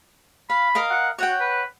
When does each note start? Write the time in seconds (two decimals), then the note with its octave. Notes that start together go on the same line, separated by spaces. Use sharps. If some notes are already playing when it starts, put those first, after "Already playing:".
0.50 F5 B5
0.75 A#4 D#5 F5
0.91 F#5
1.19 F#4 C#5 F#5 G5
1.40 B4